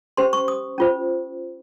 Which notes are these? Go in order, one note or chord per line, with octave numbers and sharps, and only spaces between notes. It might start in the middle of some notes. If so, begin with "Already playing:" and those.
C#4 G4 C5 C6
C#6
D#6
C#4 F4 C5